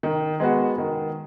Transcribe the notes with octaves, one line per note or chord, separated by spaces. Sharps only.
D#3
G#3 B3 F#4
D#3